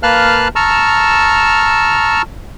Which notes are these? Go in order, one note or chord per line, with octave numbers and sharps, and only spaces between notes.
A#3 B4 F5 A5 F6 F#6
A5 A#5 C#6 E6 F6